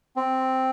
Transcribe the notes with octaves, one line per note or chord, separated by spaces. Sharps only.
C4